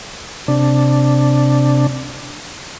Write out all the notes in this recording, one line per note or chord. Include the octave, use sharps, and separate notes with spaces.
C3 D4